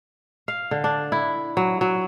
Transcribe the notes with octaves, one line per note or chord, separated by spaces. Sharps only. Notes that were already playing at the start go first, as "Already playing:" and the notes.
F5
D3
D4
E4
F#3
F#3